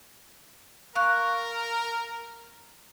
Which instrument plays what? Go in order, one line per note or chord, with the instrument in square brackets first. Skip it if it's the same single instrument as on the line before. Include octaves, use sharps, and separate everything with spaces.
[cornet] A#4 [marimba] F5 C#6 F#6